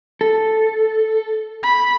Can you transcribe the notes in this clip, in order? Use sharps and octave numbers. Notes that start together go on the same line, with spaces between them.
A4
B5